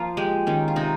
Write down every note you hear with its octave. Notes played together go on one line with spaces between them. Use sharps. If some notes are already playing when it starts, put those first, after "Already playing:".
Already playing: F3 A#3 F4
G#3 G4
D#3 C#4
F4
C3 D#4